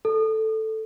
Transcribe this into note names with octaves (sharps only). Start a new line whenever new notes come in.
A4